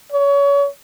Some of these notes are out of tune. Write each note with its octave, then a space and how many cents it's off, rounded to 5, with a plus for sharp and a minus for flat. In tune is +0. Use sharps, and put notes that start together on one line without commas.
C#5 +30